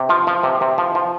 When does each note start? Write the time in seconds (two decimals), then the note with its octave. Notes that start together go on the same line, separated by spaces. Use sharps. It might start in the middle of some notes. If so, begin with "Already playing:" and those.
Already playing: C3
0.09 F3 F4
0.27 F3
0.43 C3
0.61 C3
0.78 F3
0.95 F3